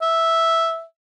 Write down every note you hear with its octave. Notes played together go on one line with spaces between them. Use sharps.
E5